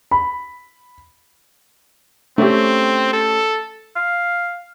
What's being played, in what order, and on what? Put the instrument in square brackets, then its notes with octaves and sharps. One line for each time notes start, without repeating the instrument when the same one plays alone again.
[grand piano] B5
[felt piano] A3 C#4 G4 [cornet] C4
[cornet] A4
[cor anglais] F5